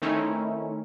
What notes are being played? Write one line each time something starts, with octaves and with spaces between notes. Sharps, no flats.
D#3 A3 C4 C#4 D#4 E4